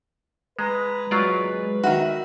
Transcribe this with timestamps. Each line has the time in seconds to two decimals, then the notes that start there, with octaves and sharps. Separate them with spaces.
0.59 G#3 B4 A#5
1.11 F#3 G#3 F4 D5
1.83 D#3 F#4 E5